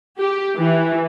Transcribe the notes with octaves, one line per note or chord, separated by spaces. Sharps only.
G4
E3